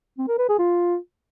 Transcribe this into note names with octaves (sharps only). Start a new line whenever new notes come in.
C4
A#4
B4
G#4
F4